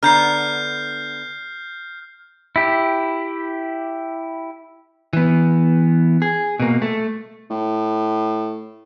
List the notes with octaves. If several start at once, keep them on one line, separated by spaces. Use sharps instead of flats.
D3 B3 A#5 F6 G6 C7
E4 G4
E3 B3
G#4
B2 A#3
A3
A2